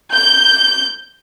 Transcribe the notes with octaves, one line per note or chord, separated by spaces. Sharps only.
G6